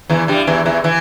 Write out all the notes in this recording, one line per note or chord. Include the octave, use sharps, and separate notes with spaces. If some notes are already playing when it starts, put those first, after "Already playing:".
E2 E3
G2 G3
E2 E3
E2 E3
E3